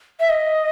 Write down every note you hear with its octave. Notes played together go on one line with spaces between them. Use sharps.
E5
D#5